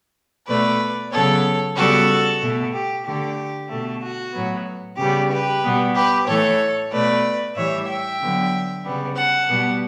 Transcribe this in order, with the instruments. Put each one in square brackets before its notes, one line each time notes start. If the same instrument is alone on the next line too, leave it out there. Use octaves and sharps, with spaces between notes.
[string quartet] B2 A3 B4 D5
C#3 F#3 B3 A4 C#5
C#3 G3 B3 F#4 A4
B2 A3
G4
D3 A3 G4
B2 A3
F#4
A2 F#3 B3
C#3 G3 B3 G4
G4 B4
B2 G3 B3
G4 B4
A2 E3 A3 A4 C#5
B2 A3 B4 D5
A2 E3 G3 C#5 E5
E5 G5
D3 F#3 B3
C#3 G3 B3
F#5 A5
B2 G3 B3